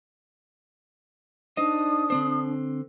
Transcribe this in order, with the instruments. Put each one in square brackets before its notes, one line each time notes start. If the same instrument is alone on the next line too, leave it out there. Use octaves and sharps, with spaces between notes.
[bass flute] D4 [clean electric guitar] D#4 C5 D#5 [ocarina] D#6
[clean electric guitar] D3 C4 C5